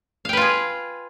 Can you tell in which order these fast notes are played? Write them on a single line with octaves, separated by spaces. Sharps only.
F5 G5 B4 F4 G#4